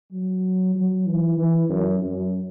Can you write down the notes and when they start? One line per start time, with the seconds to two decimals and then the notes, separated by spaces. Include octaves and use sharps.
0.12 F#3
0.75 F#3
1.07 E3
1.37 E3
1.69 F#2
2.01 F#2